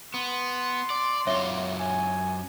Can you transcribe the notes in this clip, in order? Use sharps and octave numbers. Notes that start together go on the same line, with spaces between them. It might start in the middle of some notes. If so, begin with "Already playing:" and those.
B3 C6
D5
F#2 F4 C#5 E5 G7
G#5